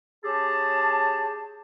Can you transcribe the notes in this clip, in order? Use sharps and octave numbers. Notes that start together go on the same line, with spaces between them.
C#4 G4 G#4 A5